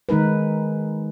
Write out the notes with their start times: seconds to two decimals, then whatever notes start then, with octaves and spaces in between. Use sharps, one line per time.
0.09 D#3 G#3 D#4 A#4 B4